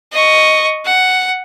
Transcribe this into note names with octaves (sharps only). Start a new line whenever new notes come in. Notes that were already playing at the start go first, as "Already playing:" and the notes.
D#5 C#6
F#5